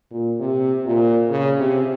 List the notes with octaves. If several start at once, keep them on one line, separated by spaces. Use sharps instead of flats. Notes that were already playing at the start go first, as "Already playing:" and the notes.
A#2
C3
A#2
C#3
C3